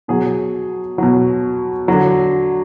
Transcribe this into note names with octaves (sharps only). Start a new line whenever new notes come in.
B2 F#3 G#4
B2 F#3
D3 F#3